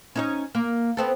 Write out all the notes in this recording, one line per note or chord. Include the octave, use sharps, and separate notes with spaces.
C#4 D#4 C#5
A#3
B3 C4 A4